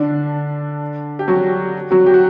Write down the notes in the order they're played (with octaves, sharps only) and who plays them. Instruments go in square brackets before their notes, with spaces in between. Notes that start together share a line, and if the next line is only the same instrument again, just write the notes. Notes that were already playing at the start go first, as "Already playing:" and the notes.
Already playing: [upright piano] D3 D4
G4
F#3 F#4
F#3 F#4
G4
F#4